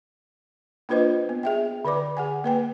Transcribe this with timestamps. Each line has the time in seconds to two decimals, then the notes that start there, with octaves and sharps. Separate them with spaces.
0.89 A#3 D4 F4 B4 C5 D#5
1.29 B3
1.43 G#4 E5 G5
1.85 D3 B4 D5 D6
2.17 G#4 F#5 G#5
2.44 A#3 B4 G5